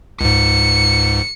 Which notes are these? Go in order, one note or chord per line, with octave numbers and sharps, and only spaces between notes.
C#2 G#2 C#7